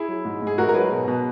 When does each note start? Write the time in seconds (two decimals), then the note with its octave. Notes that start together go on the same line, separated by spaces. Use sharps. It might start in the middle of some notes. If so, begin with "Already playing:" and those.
Already playing: E4 G#4
0.08 F#3
0.25 G#2
0.42 G#2 G#4
0.58 G#2 F#4 A#4
0.69 A#4
0.74 F#3 G#4 B4
0.91 B2
1.08 B2